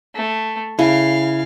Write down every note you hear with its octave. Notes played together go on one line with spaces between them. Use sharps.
A3
C#3 E4 F5